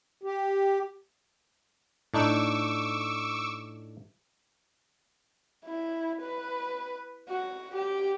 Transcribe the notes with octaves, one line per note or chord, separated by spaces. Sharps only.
G4
A2 D4 D#4 C#6 D6 E6
E4
B4
F#4
G4